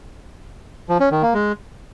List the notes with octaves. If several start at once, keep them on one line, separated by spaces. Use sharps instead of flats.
F3
C#4
D#3
A#3
G#3